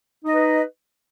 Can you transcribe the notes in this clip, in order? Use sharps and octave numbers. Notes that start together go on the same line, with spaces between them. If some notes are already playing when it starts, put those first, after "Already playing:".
D#4 B4 D#5